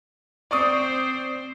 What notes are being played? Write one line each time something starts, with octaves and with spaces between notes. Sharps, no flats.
C4 C5 D5 C#6 D#6